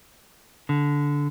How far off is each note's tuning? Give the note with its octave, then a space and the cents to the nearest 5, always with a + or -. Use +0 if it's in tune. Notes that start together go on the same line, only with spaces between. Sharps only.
D3 -15